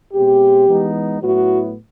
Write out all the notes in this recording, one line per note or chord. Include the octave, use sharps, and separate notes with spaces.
B2 G#3 C4 G4
E3 G#3 B3 D#4
A2 F#3 B3 E4 F#4